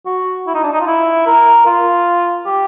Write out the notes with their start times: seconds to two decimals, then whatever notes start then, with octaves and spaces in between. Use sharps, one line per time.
0.06 F#4
0.47 E4
0.55 D#4
0.64 D4
0.73 D#4
0.81 F4
0.87 E4
1.27 A#4
1.66 F4
2.46 G4